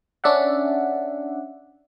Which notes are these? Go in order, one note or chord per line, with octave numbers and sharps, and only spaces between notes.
C#4 D4 D5 E5 F#5